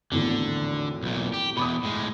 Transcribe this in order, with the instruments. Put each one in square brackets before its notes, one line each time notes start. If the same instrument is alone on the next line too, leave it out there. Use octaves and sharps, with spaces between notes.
[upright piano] G#1 E2 A2 [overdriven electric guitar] D3
[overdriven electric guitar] B1 A#2
G4
[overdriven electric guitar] E2 B2 [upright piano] B5 D6 D#6
[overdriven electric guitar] A2 G#3